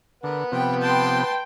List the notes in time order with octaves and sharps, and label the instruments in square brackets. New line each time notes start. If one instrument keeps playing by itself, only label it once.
[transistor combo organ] D3 [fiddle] A#4 [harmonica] B4 F#5
[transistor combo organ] C3 F3 B3 [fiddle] G5
[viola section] G5 [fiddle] A5 C6